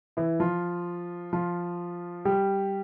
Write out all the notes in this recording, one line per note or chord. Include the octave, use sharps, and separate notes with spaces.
E3 E4
F3 F4
F3 F4
G3 G4